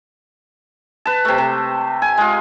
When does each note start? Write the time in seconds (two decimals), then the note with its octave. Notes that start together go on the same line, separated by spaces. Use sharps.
1.05 B4 A5
1.25 C3 A3
1.38 C3
2.02 G#5
2.18 G#3 F4